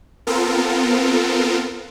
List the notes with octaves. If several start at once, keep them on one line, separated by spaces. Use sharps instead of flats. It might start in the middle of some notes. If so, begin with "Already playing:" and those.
B3 C4 F4 A4 A#4